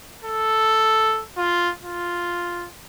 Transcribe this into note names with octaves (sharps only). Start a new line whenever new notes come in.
A4
F4
F4